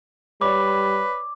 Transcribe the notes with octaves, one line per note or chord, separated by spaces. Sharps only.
G3 B4 C#5 D5 D6